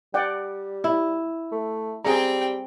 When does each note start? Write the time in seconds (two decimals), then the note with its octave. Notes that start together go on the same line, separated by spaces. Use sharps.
0.14 G3 D5 F#5 G5
0.84 E4
1.52 A3
2.05 G3 C4 G#4 G5 A#5